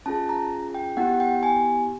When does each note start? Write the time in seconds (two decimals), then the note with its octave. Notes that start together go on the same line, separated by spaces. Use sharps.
0.06 C#4 F4 G#4 A5
0.29 A#5
0.75 G5
0.97 B3 E4 G4 F#5
1.20 G5
1.43 G#5